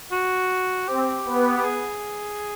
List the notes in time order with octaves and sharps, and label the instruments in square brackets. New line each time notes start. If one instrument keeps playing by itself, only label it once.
[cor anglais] F#4
[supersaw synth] C4 [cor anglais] G4
[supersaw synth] B3
[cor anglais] G4
G#4